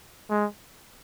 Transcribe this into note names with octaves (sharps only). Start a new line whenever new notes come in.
G#3